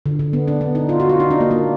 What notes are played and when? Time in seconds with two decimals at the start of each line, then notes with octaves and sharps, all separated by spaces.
0.06 D3
0.19 D3
0.33 B3
0.48 D4
0.61 B3
0.75 D#4
0.89 F4
1.00 F#4
1.09 F4
1.20 D#4
1.31 D4
1.40 A#3
1.51 A#3